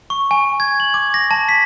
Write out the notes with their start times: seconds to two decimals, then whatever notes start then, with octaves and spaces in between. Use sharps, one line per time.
0.10 C#6
0.31 G#5
0.60 G#6
0.80 F#7
0.94 D6
1.14 A#6
1.31 A5
1.49 B6